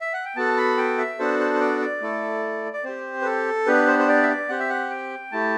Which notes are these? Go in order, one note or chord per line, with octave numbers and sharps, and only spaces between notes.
E5
F#5
G5
B3 F#4 A4 A5
B5
G5
E5
B3 D4 F#4 A4 C5
C5
C5
D5
D5
A3 E4 A4
D5
C4 G4 C5
B4
A4
B3 D4 G4 B4
C5
C5
D5
E5
D5
C4 G4 F#5
E5
F#5
G5
A3 E4 G4 A5